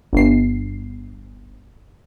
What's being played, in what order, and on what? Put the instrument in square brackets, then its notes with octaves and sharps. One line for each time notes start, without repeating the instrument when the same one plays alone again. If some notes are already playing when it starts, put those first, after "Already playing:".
[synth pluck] G1 C7